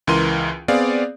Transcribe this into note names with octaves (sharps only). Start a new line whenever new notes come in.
C#2 E3 A#4 C6 D#7
B3 C4 G#4 D5 F5